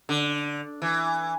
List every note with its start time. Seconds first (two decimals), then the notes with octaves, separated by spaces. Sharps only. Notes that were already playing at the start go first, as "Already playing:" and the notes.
0.09 D3
0.82 E3